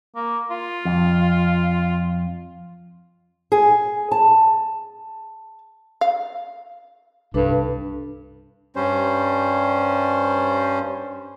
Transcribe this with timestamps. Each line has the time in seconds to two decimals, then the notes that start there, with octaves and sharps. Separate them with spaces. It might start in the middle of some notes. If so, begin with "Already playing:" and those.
0.16 A#3
0.50 F4
0.85 F2
3.52 G#4
4.12 A5
6.01 F5
7.34 C2 G2 D4 A4 B4
8.76 G2 G3 C#4 C5